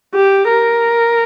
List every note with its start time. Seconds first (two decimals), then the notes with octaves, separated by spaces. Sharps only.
0.15 G4
0.50 A#4